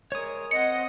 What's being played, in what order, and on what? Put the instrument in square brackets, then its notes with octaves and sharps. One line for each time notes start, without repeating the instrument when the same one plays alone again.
[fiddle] G#3 A#4 [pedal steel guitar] C#5 D#6
[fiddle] C4 F#5 [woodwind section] D#5 [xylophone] C#7